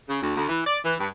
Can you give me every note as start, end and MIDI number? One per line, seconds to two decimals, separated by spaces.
0.08 0.20 49
0.22 0.34 38
0.36 0.47 38
0.49 0.62 52
0.66 0.79 74
0.85 0.95 52
0.99 1.08 43